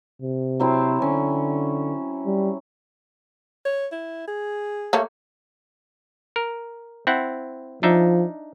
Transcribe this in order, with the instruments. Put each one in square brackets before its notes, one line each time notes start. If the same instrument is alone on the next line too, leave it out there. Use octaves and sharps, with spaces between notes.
[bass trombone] C3
[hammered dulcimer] F#3 C4 E4
[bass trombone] D3 [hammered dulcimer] C#4
[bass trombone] G3
[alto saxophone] C#5
E4
G#4
[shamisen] A3 A#3 C#5
[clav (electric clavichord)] A#4
C4 E4 F#5
[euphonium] F3 [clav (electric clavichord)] D4 D#4 E5